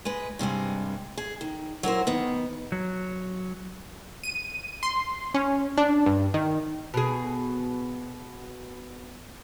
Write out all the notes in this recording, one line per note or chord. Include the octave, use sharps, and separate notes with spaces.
G#3 B4
G2 C3 G3 G#3
G#4
D#3
F#3 E4 A#4 C5
D#3 B3
F#3
D#7
C6
C#4
D4
G2
D#3
B2 G#4